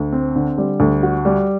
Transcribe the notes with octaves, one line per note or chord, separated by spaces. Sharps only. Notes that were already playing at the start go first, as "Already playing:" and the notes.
Already playing: D2
C4
D3
G3
D2
F#4
G3